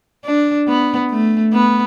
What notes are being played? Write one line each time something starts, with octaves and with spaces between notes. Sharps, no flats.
D4
B3
A3
B3